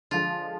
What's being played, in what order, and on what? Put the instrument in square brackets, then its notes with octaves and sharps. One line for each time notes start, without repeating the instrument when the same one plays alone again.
[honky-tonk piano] D3 F3 G#3 [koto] F4